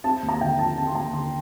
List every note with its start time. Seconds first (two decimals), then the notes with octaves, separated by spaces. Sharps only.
0.04 C4 A5
0.23 D#2
0.29 A#5
0.41 D3 G5
0.59 F3 A5
0.77 C4 A5
0.87 C6
0.95 D#2 A#5
1.13 D3 C6